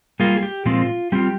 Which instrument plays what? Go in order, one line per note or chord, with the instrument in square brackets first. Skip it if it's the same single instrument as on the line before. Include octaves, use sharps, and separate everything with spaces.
[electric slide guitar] G3 A#3 F4 G#4
G#4
G4
A#2 F3 G#3 C4 F4
G3 C4 F4 G4